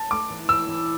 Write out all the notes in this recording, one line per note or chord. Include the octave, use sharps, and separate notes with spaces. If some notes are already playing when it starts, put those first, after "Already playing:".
Already playing: A5
A3 D6
E3
E3 E6
E3